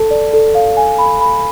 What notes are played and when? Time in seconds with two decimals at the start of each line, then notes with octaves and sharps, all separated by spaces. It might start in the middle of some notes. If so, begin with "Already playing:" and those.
Already playing: A4 A5
0.11 D5
0.33 A4
0.55 F5
0.77 G#5
0.98 B5
1.21 B5